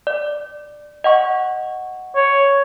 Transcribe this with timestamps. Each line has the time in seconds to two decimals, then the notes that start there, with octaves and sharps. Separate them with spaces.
0.07 D5
1.04 D#5 F#5 C#6
2.16 C#5